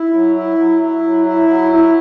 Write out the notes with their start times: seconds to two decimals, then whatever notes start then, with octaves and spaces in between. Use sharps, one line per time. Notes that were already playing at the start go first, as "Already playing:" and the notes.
Already playing: E4
0.13 F#3
0.35 E4
0.58 F#3
0.80 E4
1.03 F#3
1.26 E4
1.48 F#3
1.72 E4